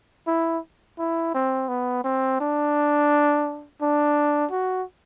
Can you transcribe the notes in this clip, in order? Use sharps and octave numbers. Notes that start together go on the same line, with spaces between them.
E4
E4
C4
B3
C4
D4
D4
F#4